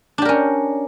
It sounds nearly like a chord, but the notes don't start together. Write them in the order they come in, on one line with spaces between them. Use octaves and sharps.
D4 G4 A#4 C#4